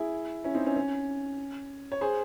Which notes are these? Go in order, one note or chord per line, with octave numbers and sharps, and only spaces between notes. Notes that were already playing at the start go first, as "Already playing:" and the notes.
Already playing: E4 G#4
C#4 E4
C4 D#4
C#4
C#4
C#5
G#4 C5